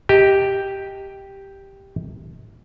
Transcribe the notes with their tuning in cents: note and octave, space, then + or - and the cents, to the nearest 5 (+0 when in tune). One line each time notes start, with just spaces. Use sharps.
G4 +0 D#5 +15 A5 +45